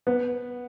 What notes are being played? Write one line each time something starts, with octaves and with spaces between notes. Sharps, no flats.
B3